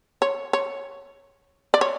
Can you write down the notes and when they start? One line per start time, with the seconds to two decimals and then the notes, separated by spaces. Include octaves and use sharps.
0.22 C#5
0.53 C#5
1.74 D5
1.81 C#5